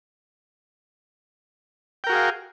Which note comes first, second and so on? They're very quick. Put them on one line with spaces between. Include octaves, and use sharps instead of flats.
G5 A#4 F#4 G#4 F5